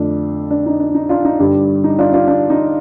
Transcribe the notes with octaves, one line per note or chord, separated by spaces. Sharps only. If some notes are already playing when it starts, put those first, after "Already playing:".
Already playing: F2 D3 A3 D4
D4
D#4
D4
D#4
D4 F4
D#4
G2 D3 G3 D4
D#4
D4 F4
D4 F4
D4
D#4